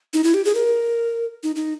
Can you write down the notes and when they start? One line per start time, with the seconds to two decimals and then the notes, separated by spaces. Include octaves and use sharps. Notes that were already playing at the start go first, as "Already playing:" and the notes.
0.14 D#4
0.24 E4
0.34 G4
0.45 G#4
0.55 A#4
1.43 D#4
1.56 D#4